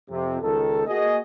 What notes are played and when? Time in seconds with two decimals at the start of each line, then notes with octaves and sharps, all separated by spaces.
0.10 F2 C3
0.42 C#2 D#3 A4
0.87 A#3 F#4 G#4 D#5